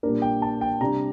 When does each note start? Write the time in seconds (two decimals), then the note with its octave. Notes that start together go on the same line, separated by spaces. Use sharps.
0.03 A#2 G3 A#3 D4 A#4
0.22 G5
0.42 A5
0.61 G5
0.81 C3 G3 D4 A#5